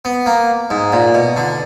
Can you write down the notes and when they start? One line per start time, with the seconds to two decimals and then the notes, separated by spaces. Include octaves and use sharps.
0.05 B3
0.26 A#3
0.70 G#2
0.93 A#2
1.14 B2
1.37 D3